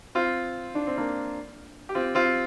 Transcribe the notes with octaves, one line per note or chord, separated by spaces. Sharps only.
C4 F4
D4
C4
A#3 D4
G4
C4 F4
C4 F4